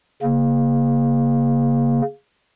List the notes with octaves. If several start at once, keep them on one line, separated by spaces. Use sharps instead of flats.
C#3 A#3